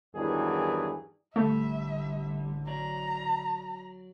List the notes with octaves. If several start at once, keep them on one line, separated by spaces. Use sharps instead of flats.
E2 G2 D#3 E3 F#3 G#4
A1 D3 G3 A3 E5
F#3 D5 A#5